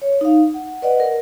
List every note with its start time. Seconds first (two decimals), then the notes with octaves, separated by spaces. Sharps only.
0.02 C#5
0.21 D#4 F5
0.54 F#5
0.82 B4 D5 D#5 F#5
1.00 A#4